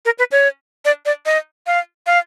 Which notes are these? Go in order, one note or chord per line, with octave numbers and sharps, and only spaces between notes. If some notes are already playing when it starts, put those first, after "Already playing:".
A#4
B4
C#5
D5
D5
D#5
F5
F5